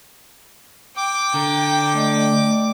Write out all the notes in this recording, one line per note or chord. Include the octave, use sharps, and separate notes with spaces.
G5 D6
D3 A#5
A3 D5 D#5